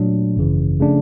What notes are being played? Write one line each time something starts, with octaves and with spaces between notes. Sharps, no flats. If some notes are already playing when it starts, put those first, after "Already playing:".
Already playing: A#2 F#3 A3 D4
G#1 F#2 C#3 E3
C#3 F3 A3 D4